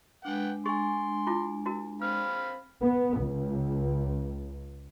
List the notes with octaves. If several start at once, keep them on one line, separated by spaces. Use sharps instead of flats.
G#3 D4 B4 F#5 G5
G#4 G#5 C6 C#6
E4 F4 D6
E4 F#4 A#4
C4 F5 B5 F6
B3
C#2